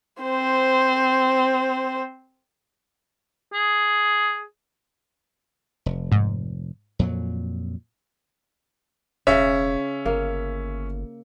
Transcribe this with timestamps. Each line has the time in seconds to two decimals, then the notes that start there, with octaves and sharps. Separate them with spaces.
0.23 C4 C5
3.53 G#4
5.86 F1
6.12 G#2
6.99 F2 A#2 F#3
9.27 E1 C#3 C#4 E5
10.06 G1 A#3